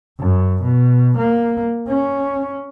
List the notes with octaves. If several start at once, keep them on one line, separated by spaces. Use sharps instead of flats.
F#2
B2
A#3
C#4